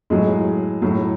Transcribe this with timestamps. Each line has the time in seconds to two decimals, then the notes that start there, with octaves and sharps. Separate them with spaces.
0.10 A2 F#3 G#3
0.82 A2 F#3